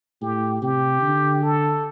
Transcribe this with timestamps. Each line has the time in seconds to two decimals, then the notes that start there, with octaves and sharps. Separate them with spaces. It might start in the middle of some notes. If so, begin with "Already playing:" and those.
0.22 A2 G4
0.62 C3 G4
1.02 D3
1.43 A4